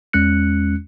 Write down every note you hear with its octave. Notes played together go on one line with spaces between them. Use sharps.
E2 G#3 C#4 F#6 C#7